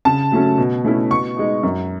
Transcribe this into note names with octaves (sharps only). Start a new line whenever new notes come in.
C#3 A5
F#3 A3 C#4
B2
A3 C#4 E4
B2 C#6
G#3 D#4
F#2